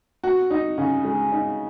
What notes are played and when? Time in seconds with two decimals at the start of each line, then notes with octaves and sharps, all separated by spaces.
0.24 F#4
0.50 D#4
0.78 C#3
1.05 G#3
1.32 D#4